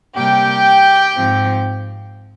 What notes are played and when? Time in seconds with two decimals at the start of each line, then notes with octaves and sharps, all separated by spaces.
0.15 C3 G3 A#3 G4 G5
1.14 G#2 F3 C4